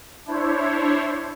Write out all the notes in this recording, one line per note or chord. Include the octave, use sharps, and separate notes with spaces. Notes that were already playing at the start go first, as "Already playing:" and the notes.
D4 E4 C5 C#5